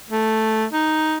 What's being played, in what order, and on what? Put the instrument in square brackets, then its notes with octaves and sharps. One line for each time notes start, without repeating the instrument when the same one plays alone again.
[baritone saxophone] A3
D#4